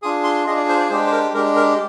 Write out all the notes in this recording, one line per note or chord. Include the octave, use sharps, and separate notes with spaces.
D4 F4 G#4 D#6
C6
D4 F4 G#4 D#5
D5
C5
D5
G#3 D4 G4 C5
C5
A#4
G#3 D4 G4 A#4
A#4